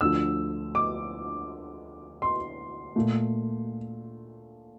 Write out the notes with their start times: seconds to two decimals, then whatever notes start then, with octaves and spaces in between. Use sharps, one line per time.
0.01 D2 D3 F3 E6
0.75 D6
2.22 C6
2.96 A#2 A3